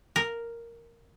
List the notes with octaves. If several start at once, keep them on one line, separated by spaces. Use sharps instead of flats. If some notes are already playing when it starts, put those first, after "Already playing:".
A#4